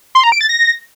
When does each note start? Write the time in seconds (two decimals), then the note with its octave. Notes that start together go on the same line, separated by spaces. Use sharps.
0.15 C6
0.23 A#5
0.32 D7
0.41 A6
0.49 A#6